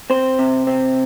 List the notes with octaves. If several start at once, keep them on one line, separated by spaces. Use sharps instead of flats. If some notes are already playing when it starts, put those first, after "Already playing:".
C4 C5
C3
C4